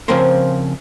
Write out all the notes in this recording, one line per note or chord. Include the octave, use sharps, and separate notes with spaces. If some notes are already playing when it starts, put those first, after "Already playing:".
C#3 F3 C4 C#4 A#4 C5